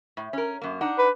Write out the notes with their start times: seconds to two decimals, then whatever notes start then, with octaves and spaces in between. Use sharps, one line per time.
0.17 A2
0.33 C#4 A#4
0.62 F#2 A#3
0.81 D4 D#4 F#5
0.99 B4